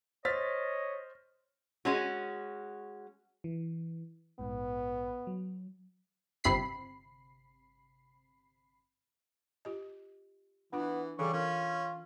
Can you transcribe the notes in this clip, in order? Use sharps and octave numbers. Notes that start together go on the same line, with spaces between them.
C5 C#5 D#5 F6 A6 B6
G#3 C#4 F#4
E3
A#1 G#2 B3
F#3
G1 C3 B5 C7
F4 G4 D#5
E3 B3 D4 F4
C#3 E3 G3 A4 C#6
C#4 F4 A#4